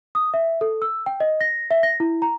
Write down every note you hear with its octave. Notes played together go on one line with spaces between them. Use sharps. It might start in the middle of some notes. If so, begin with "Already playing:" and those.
D#6
E5
A4
E6
G5
D#5
A#6
E5
A#6
E4
A#5